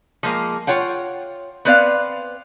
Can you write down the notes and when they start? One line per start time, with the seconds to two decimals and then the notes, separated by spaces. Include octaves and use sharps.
0.23 F3 G#3 A#3
0.67 F4 C#5 F#5 G5
1.65 B3 C4 B4 D5 D#5 F5